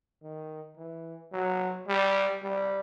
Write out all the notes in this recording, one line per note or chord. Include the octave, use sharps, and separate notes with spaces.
D#3
E3
F#3
G3
G3